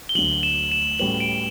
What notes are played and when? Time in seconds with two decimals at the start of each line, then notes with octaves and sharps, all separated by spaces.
0.09 G7
0.15 D2 D3 F#3 F#7
0.43 E7
0.72 E7
0.99 A2 G3 C#4 F#4 B4 F#7
1.20 D7